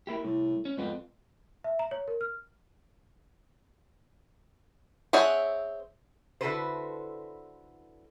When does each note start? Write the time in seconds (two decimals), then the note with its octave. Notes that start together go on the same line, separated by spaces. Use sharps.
0.07 A#3 E4 G4
0.24 C2 A2
0.65 C#4
0.77 F2 G#2 B3 C4
1.64 E5
1.79 A#5
1.91 C#5
2.08 A#4
2.21 F6
5.13 C4 G#4 C#5 E5 F#5
6.41 D3 E4 F#4 A4 B4 C5